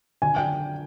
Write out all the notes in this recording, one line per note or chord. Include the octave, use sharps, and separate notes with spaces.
D3 G#5
G5